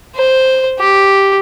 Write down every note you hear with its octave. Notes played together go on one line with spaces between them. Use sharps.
C5
G4